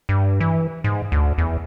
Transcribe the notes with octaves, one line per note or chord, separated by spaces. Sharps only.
G2
E3
G#2
D2
E2